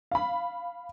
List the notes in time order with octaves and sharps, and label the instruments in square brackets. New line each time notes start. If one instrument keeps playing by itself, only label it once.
[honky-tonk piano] F5 B5